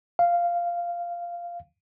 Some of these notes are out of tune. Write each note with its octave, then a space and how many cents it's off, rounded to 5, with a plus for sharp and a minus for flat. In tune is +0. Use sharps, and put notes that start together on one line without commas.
F5 -10